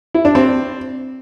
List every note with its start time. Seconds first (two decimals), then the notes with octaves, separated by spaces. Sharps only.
0.15 E4
0.25 D4
0.35 C4